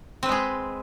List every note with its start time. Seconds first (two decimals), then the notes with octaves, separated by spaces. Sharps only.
0.23 C4
0.26 B4
0.29 G#3
0.32 G#4